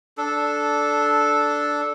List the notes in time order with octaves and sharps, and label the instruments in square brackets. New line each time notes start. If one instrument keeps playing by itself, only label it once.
[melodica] D4 A4